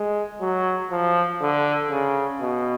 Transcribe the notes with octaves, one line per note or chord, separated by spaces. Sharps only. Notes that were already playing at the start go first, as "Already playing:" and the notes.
Already playing: G#3
F#3
F3
D3
C#3
B2